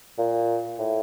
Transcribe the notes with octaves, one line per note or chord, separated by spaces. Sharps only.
A#2
A2